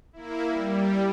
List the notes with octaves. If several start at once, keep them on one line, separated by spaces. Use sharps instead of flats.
A#3 E4
G3